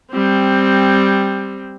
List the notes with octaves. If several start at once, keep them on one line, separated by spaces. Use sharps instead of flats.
G3 C4